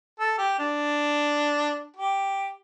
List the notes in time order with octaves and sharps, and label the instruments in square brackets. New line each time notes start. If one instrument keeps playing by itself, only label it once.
[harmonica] A4
G4
D4
G4